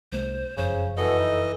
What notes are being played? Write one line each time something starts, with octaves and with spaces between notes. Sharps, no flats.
C2 G#3 A#3 C5
F#1 F2 C#3 C5
B2 E3 A4 D#5
D#4